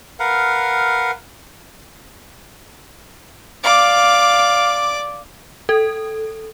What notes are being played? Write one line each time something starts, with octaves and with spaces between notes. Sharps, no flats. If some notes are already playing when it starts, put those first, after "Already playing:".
A#4 B4 F5 F#5
D5 F5 D6
A4